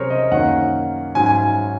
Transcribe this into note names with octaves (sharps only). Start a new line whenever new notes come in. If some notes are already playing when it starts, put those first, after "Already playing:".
Already playing: C3 F#3 C#4 G#4 A#4 C5 C#5
D#5
F#2 D#3 A#3 C#4 F#5
G#2 F#3 C#4 G#5
G#5